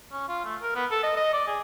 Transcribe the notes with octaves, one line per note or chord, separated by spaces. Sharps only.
C#4
F4
A3
A#4
B3
A4
D#5
D#5
D5
G#4